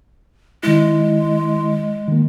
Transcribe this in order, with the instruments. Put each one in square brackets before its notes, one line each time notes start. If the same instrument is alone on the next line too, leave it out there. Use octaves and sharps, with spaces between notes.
[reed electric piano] D#3 E4 [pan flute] G#3
[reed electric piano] D#3 A#3